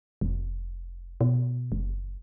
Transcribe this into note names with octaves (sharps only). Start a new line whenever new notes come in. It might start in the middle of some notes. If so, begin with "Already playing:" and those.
F1
B2
F#1